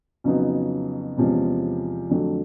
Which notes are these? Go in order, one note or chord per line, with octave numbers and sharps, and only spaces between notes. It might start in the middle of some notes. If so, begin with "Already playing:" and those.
F2 C#3 F#3 B3 D#4
E2 C3 F3 G#3 C#4
F2 D3 F#3 A3